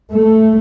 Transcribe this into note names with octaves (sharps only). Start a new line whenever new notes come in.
A3